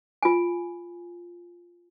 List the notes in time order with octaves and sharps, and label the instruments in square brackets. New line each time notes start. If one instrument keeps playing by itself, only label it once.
[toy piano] F4 G#5